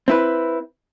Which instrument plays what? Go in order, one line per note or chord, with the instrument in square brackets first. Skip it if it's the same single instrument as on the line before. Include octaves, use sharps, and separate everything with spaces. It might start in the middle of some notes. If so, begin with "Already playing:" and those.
[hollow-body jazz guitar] C4 E4 B4